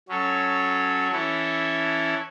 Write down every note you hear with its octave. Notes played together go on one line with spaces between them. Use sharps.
F#3 C#4 A4 C#5
E3 C#4 E4 A4 C#5